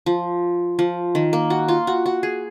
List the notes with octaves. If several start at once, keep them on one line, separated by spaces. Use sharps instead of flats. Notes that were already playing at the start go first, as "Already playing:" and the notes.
F3
F3
D#3
A#3
F#4
F4
F#4
F#4
G#4